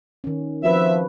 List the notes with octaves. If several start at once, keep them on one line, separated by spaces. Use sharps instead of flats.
D#3 C#4
F3 C4 F#4 B4 E5